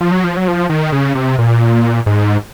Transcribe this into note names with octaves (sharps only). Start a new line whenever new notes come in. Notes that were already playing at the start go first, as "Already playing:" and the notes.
F3
F#3
F3
F#3
F3
D#3
C#3
C3
A#2
G#2